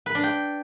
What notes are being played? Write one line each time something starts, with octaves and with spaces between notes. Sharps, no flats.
B4
D4
G5